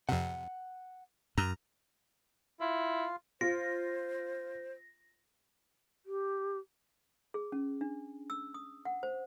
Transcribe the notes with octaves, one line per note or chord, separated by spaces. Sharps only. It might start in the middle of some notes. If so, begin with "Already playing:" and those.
F2 C3 F#5
F#2 A#5
E4 F4
F4 C5 A#6
G4
G#4
C#4
D4
E6
D#6
F#5
C5